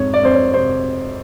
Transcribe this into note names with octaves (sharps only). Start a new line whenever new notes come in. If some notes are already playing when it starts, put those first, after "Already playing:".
Already playing: F2 G#2 C#5
D5
F2 C5
C#5
C3 C5